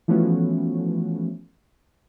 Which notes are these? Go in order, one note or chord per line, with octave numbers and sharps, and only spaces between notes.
E3 F3 A3 B3 C#4 F#4